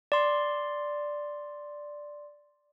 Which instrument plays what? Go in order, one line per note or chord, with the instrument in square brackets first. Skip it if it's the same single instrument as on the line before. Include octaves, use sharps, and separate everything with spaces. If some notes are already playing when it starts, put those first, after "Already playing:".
[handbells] D5 C6